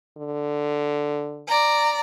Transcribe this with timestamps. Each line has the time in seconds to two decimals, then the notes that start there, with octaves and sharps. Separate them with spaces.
0.17 D3
1.47 D5 A#5